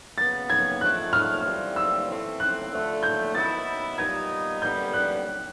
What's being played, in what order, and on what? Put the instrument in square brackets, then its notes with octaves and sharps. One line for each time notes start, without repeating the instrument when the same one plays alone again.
[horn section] C#3 F#3 B3 [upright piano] A6
[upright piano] G#6
[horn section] G#2 F3 A3 D4 [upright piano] F#6
[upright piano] F6
[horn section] A2 E3 G3 C4 F4
[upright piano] E6
[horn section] A2 E3 A3 C4
[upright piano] F#6
[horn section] D3 F3 A3
[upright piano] G6
[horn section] D#3 F#3 B3 E4 [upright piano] A6
[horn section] A#2 G3 B3 D#4 [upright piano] G#6
[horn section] F#2 D3 G3 B3 [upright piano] G6
[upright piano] F#6